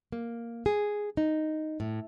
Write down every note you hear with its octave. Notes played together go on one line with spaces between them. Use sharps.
A#3
G#4
D#4
A2